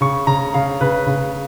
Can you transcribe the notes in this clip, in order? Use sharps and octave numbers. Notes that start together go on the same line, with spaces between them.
C#3 C#6
C#3 A#5
C#3 F5
C#3 B4
C#3